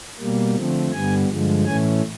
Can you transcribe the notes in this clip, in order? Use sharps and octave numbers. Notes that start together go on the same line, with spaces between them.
B2 G3 A#3
D3 F3 A3 C4
G2 D3 G3 B3 G#5
G2 D3 F3 G#3
A2 E3 A3 C#4 G#5